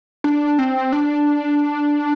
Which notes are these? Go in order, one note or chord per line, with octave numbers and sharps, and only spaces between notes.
D4
C4
D4